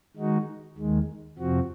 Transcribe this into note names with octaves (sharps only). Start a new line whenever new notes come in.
D#3 G#3 D#4 F#4
D#2 D#3 G#3
F2 C3 F3 C4 F#4